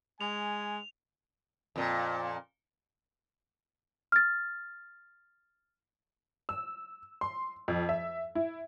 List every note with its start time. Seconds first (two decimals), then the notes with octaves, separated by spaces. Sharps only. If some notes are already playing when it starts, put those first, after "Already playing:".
0.21 G#3 G#5 F7
1.76 F2 A#2
4.12 F6 A6
6.49 E6
7.21 C6
7.68 F2
7.89 E5
8.35 E4